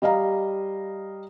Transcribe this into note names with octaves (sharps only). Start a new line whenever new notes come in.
G3 D#5 F5 A#5